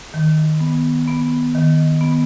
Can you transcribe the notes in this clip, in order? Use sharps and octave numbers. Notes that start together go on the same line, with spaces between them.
D#3
B3
B3
D#3
B3